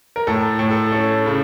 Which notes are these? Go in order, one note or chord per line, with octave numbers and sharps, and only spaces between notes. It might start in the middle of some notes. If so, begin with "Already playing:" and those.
A#4
A2 A4
A2
A4
C#4 A4
C#3